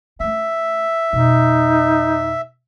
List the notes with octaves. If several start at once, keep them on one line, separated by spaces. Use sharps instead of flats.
A3 C#4 E5
F2 B2 D#4